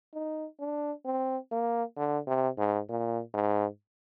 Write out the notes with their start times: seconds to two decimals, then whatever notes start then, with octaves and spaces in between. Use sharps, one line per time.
0.14 D#4
0.60 D4
1.05 C4
1.51 A#3
1.97 D3
2.27 C3
2.58 G#2
2.89 A#2
3.34 G#2